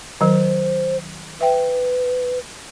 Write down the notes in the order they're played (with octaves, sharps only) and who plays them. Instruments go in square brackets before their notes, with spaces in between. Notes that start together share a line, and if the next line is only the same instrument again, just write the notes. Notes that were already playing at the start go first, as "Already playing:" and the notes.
[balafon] D#3 F#3 [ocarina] C5
[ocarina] B4 [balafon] E5 G5